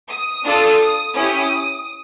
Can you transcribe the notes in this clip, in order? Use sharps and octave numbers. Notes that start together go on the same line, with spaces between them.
D#6
D4 F4 A4
D#6
C#4 E4 G4 D#6